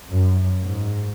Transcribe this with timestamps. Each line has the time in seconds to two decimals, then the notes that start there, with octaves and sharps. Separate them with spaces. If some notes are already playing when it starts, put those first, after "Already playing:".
0.11 F#2
0.61 G#2